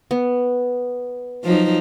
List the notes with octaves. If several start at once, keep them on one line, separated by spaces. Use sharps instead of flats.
B3
F3 F#3 D#4